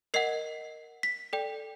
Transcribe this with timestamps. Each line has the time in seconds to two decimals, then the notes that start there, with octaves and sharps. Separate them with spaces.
0.14 A#4 D#5 F#5 C7
1.03 B6
1.33 A4 D5 G5